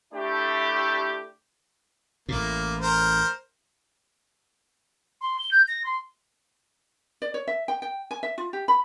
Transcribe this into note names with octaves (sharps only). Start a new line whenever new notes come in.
A3 D4 E4 G4
A1 A2 A#3
A#4 C5
C6
G7
G6
A#6
C6
D5
C#5
E5
G5
G5
G#5
E5
F4
G4
B5